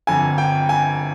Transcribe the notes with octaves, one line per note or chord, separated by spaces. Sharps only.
G1 F2 D3 F3 G#5
G5
G#5